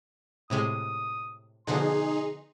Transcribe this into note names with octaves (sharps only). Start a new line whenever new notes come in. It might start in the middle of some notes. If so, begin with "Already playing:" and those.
A2 C3 G#3 D#6
B2 D3 F3 D#4 G#4 C6